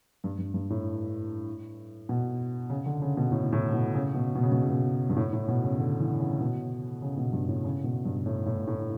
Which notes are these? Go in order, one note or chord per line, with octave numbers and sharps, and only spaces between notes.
G2
G2
G2
A2
B2
C#3
D3
C#3
B2
A2
A2
B2
C#3
B2
B2
C#3
B2
C#3
B2
G2
A2
A2
B2
C#3
D3
E3
C#3
B2
C#3
B2
G2
A2
C#3
B2
G2
A2
A2
A2